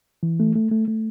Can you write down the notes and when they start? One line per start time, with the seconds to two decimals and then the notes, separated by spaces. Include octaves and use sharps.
0.23 E3
0.40 A3
0.55 A3
0.71 A3
0.88 A3